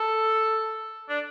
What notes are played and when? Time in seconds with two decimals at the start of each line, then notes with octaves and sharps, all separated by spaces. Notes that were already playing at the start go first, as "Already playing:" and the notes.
Already playing: A4
1.09 D4